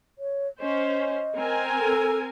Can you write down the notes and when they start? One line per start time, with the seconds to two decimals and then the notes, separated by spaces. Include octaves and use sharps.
0.19 C#5
0.60 C#4 C5 D#5
1.35 C4 A#4 G#5
1.80 A4